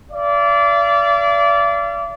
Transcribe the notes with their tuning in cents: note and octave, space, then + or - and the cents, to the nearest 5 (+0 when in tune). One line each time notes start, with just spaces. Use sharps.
D5 -25 F5 -45